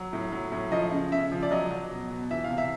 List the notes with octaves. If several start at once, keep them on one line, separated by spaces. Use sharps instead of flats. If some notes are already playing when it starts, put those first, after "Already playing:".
Already playing: F#3
A2
F#3
A2
F3 D#5
C#3
C#3 E5
F3
D5
F#3 D#5
F#3
B2
B2
E3 E5
F5
C3
E5